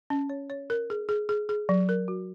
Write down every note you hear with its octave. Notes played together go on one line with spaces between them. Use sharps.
C#4
C#5
C#5
A#4
G#4
G#4
G#4
G#4
F#3
A#4
F#4